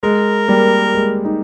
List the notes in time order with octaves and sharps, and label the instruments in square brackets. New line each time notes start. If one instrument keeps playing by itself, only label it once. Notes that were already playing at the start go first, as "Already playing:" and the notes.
[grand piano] G#3 [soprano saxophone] A#4
[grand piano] G3 A#3
G#3
D#4 G4